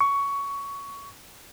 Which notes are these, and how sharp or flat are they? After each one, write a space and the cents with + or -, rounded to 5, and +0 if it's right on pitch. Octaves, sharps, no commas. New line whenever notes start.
C#6 +15